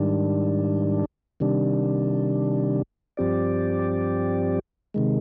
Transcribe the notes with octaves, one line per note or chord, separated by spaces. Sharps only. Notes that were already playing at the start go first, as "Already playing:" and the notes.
Already playing: G#2 D#3 G3 D4
C3 D#3 G3 D4
G2 F3 C4 G4 D5
C3 D#3 G#3